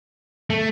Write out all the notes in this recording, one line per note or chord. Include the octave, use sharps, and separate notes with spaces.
A3